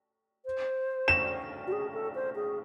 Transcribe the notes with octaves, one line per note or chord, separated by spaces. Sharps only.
C5
E7
F#4
G#4
A4
C5
G#4